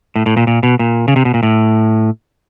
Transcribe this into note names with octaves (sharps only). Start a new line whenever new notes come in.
A2
A2
A#2
A#2
B2
A#2
C#3
C3
B2
A#2
A2